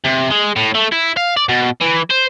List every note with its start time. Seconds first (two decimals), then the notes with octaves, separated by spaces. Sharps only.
0.06 C3
0.31 G#3
0.56 A2
0.75 A3
0.92 E4
1.17 F5
1.37 D5
1.49 B2
1.81 E3
2.10 C5